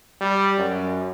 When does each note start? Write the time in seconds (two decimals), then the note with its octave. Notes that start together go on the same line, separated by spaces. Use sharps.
0.21 G3
0.58 F#2